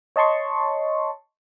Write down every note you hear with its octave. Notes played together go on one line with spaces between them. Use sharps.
C#5 D#5 A5 C6 C#6